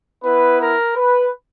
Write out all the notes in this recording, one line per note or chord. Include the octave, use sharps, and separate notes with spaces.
B3 E4 B4
A#4
B4